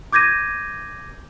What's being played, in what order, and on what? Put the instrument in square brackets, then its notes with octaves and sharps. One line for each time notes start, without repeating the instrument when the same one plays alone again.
[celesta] D6 G6 G#6 A#6 D#7